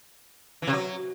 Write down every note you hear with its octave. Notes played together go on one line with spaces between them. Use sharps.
E3
C3
F#3